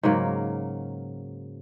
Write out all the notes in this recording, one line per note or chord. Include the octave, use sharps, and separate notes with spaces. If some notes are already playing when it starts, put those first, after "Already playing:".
G#2 C#3 F#3 A#3